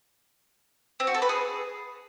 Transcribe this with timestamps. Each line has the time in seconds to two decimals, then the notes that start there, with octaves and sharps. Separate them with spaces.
1.00 C4
1.07 F#4
1.15 A4
1.22 B4
1.29 G#4